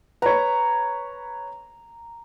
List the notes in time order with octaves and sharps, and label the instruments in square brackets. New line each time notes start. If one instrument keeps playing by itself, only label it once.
[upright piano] B4 C#5 [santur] A#5